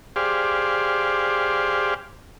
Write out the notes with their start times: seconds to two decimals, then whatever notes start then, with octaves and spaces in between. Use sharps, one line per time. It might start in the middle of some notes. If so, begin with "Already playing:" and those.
0.16 G4 G#4 C5 D5 F5